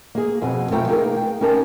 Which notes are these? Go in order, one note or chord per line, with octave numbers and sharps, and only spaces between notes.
A#3 G#4
F2 B2 C4 G#5
B2 F3 A3 F4 G5 A#5
A#3 D#4 G#4 A#4
G5
C#4 D#4 G4 A#4 G5 A5